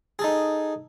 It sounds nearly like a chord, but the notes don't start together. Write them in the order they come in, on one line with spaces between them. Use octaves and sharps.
G#4 A4 D#4